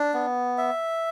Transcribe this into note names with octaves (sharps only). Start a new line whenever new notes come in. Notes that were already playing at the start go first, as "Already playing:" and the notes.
Already playing: D4
B3
E5